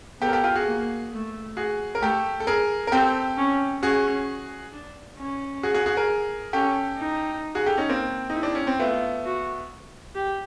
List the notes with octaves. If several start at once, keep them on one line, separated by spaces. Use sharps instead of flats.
B3 G4 A4
A#4
G4 A4
F4 G4
F#4 G#4
A#3
A3
F#4 G#4
A#4
A3 G4 A4
A4
G#4 A#4
A#4
C4 G4 A4
C#4
C#4 F#4 G#4
D4
C#4
F#4 G#4
F#4 G#4
F#4 G#4
G#4 A#4
C#4 G4 A4
D#4
F#4 G#4
G4 A4
C#4 D#4
A#3 C4
D#4 E4
D4
C#4
C4
A3 B3 F4
F#4
G4